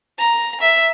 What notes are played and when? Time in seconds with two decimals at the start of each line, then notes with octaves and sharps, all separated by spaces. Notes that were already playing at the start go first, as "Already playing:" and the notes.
0.18 A#5
0.61 E5